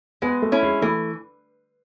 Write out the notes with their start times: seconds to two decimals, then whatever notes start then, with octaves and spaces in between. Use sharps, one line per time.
0.22 G#3 B3
0.42 A3
0.52 C#4 E4
0.63 G#3
0.82 E3 A3